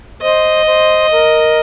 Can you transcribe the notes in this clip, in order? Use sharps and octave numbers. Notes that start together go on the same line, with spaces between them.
C5 D#5
C5
A#4